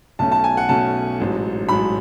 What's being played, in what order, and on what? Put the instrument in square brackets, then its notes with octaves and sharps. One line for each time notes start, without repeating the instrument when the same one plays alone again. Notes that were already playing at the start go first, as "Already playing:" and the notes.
[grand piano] B1 B2 A3 C#4 A5
A5
G#5
F#5
B1 B2 A3 C#4 A5
A1 G#2 F#3
A1 G#2 F#3 B5